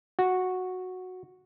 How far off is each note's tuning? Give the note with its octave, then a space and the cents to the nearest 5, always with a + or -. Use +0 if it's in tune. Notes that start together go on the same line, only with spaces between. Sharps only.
F#4 -10